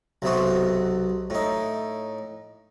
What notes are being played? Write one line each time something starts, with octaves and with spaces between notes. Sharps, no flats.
B1 C3 B3 F#4
A2 D#4